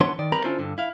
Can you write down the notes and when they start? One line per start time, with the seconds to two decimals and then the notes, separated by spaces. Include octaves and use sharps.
0.01 E3 B3 D4 C#5 C6
0.19 D#3 D5
0.32 G3 C4 A#4 B4 A#5 B5
0.44 D3 C#4 D4 E4 F4 C5
0.59 G2 D3
0.78 E4 F5